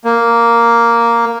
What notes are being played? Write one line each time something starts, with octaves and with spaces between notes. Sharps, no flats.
A#3